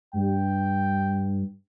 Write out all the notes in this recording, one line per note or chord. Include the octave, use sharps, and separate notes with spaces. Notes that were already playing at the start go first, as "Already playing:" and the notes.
G2 G5